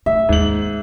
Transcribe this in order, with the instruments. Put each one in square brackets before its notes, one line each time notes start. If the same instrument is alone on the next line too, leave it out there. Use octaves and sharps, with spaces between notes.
[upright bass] A2 [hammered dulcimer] E5
[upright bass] D#2 [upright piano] G#2 F#7